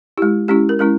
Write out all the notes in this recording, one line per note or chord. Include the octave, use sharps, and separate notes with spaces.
G#3 E4 G4
G#3 C#4 E4 G4
A#4
G#3 C#4 E4 A#4